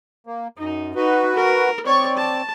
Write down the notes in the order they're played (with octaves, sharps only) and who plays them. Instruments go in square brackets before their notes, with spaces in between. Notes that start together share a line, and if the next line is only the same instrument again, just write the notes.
[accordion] A#3
[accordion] F#2 [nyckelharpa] D#4
[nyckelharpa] D#4 [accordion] F#4 B4
[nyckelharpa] A#4
[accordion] C4 D5 [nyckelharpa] C#5 C#6
[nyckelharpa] A5